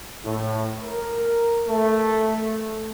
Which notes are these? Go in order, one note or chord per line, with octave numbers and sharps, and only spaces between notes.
A2
A#4
A3